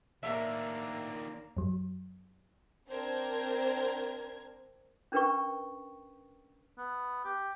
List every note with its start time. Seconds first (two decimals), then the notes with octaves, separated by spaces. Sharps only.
0.23 A2 D#3 F#3 A#3 D4 E5
1.57 F#2 F#3
2.89 C4 D4 A#4 C5 G#6
5.12 C#4 D4 A#4 B4 G5 C#6
6.78 B3
7.25 G4